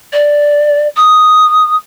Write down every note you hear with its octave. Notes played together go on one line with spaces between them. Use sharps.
D5
D#6